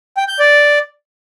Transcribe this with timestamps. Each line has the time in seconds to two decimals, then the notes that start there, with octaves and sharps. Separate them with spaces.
0.17 G5
0.28 G6
0.39 D5